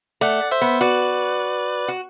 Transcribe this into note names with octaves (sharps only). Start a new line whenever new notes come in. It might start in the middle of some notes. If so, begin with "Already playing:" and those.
A3 D5 F#5
C5 E5
B3
F#4 B4 D5
F#4